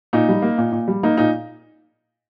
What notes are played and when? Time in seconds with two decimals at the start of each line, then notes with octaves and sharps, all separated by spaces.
0.13 A#2 D#4
0.29 G3
0.42 A#3
0.58 A#2
0.72 A#2
0.88 G3
1.03 A#3 D#4
1.17 A#2 D#4